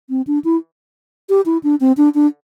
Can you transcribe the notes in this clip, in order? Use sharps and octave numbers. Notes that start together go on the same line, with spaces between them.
C4
D4
E4
G4
E4
D4
C4
D4
D4